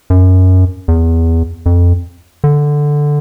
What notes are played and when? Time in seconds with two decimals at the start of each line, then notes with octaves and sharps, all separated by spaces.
0.10 F#2
0.88 E2
1.66 F2
2.44 D3